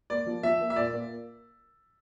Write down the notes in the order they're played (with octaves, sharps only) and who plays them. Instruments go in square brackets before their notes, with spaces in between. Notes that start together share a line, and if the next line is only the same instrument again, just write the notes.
[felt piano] A#3 [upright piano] D5
[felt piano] F3
[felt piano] F3 [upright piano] E5
[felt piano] A#3
[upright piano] E5
[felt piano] A#2 [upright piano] D5
[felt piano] A#3